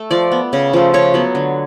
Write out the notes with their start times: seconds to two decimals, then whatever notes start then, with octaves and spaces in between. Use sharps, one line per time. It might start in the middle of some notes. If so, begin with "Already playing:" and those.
Already playing: A3
0.11 F3 D5
0.32 B3
0.53 C#3
0.73 F3 A3
0.94 C#3 C#5
1.14 F#3 B3
1.35 D3